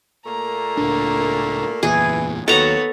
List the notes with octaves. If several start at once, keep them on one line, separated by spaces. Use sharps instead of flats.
A#2 A3 A#3 A#5
C#2 A2 D4
F#1 E2 A#2 E3 G#4
D#2 F#3 B3 A4 C#5 A#5